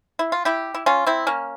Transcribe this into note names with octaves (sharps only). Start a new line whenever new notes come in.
E4
F4
E4 G4
E4
C#4 F4
C4 E4
A#3 C#4